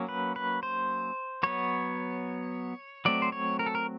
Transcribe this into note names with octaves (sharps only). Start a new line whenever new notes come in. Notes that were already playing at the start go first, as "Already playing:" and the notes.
Already playing: F#3 A#3 C#4
B4
B4
C5
F#3 B3 C#5
F#3 A3 C4 D5
C5
C#5
A#4
A4
A#4